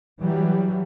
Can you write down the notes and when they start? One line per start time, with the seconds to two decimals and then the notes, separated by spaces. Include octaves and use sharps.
0.22 E3 F#3 G3